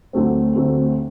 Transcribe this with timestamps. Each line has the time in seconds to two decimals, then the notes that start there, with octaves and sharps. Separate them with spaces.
0.13 D2 D3 F#3 A3 C4
0.55 D2 D3 F#3 A3 C4